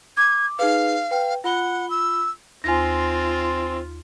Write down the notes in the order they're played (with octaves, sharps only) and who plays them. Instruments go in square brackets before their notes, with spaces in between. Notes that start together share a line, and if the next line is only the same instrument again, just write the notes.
[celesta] D6 [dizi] G#6
[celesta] D#4 G#4 B4 [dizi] F5
[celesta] B4 G5
[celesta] F4 B5 G7 [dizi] F#5
[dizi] E6
[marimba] D#2 [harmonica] C4 [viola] F4 [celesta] G#5 A#6